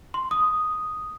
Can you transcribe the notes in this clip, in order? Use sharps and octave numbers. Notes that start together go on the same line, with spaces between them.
C6
D#6